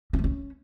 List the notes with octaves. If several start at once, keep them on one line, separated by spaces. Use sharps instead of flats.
C#4
A3
C#4